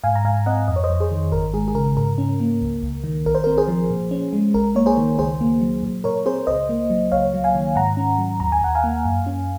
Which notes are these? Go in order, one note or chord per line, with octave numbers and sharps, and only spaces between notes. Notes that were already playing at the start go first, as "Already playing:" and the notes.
G#2 F5 G#5
A#5
G#2 F5 G#5
C4 D#5 F#5
F2 D#5
C#5
C5 D#5
F2
G#4 C5
D#3
G#1 A#4
G#3 G#4
G#4
C#3 A#4
G#2 A#4
C#4
A#3
C#2
C#2
D#3
A#1 A#4
C5
C4 A#4
G#4 C5
F3
A#2
C#4
G#3
A#1 A#4
A#3 C#5
G#4 C5
D#3
C#2 G#4 C5
A#3
F#3
A#2
A#2 A#4 C#5
C4 G#4 C5
C#2 C5 D#5
A#3
F#3
C#2 C#5 F5
F#3
F5 G#5
D#3
G#2 F#5 A#5
C#4
F#3
D#2 A#5
G#5
D#2 F#5
F5 G#5
A#3
F#2
C#4